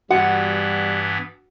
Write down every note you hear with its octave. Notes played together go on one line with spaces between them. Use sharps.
G2 E3 G3 B3 F#4 F#5